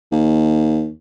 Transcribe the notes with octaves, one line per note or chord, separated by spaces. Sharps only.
D#2